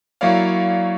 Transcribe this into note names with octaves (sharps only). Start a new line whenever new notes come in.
F#3 A#3 E4 C#5 D5 F5